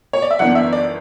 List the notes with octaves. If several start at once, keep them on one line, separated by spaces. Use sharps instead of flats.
C#5
D5
E5
G1 F#2 E3 B3 D4 F#5
E5
D5